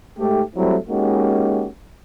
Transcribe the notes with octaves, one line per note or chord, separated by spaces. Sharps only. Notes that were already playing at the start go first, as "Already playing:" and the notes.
G#2 A3 G4
F#3 G3 A3 C4 E4
G#3 A#3 C#4 D#4 F#4 G4